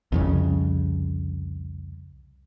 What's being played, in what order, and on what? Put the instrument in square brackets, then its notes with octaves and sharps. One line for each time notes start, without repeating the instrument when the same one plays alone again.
[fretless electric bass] C2 F2 C#3